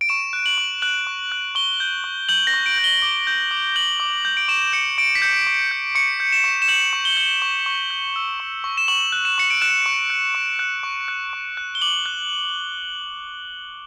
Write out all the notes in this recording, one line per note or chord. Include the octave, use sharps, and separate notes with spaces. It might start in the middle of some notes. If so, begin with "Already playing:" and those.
D7
C#6 E7
F#6
F#7
C#6
F#6 F#7
C#6
F#6
C#6 G7
G6
C#6
G6 F#7
A#6
C#6
D7
G6
G7
D6
G6
D6
G6 F#7
D6
G6
D7
C#6 E7
G6 C#7
C#6 D7
B6
G6 C#7
C#6
G6
C#6 C#7
G6
E7
C#6
E7
G6 F#7
C#6
G7
G6
C#6
C#6
G6
E6
C#6
C#6
E7
C#6 F#7
F#6
E7
C#6 C#7
D7
F#6 E7
C#6
F#6
C#6
F#6
C#6
F#6
C#6
F#6
G7
D6 F#7
F#6